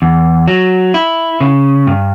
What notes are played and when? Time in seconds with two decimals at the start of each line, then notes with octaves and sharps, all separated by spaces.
0.02 E2
0.48 F#3
0.94 E4
1.41 C#3
1.87 G2